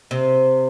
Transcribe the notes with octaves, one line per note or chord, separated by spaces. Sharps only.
C3